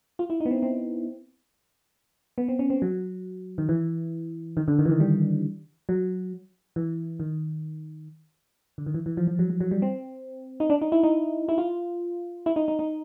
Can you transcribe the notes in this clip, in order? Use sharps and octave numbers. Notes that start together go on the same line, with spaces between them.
F4
E4
D#4
B3
C4
C4
B3
C4
C#4
C4
F#3
D#3
E3
D#3
D3
D#3
E3
D#3
G3
F#3
E3
D#3
D3
D#3
E3
E3
F3
F3
F#3
F#3
F#3
G3
C4
D#4
D4
D#4
E4
D#4
E4
F4
E4
D#4
D#4
D#4